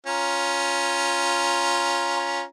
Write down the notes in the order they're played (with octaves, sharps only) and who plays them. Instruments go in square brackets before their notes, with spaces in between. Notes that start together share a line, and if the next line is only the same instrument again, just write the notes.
[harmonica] C#4 F4 A#5